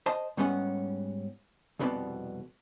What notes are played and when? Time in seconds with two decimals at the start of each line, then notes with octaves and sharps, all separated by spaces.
0.06 C5 D#5 A5
0.37 G#2 G3 B3 C#4 F#5
1.79 C2 F2 B2 B3 C4 D5